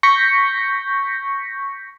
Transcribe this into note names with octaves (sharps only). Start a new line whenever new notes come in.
C#6 G6 A#6 B6 C#7